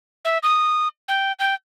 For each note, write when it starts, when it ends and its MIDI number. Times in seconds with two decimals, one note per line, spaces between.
0.25 0.38 76
0.43 0.88 87
1.08 1.32 79
1.39 1.54 79